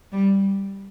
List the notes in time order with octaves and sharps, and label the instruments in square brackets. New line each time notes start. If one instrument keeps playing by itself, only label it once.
[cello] G3